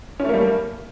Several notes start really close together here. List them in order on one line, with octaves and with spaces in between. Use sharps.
C#4 A3 A#3 G3